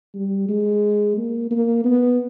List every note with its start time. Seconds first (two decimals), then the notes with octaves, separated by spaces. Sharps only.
0.15 G3
0.49 G#3
1.17 A#3
1.51 A#3
1.84 B3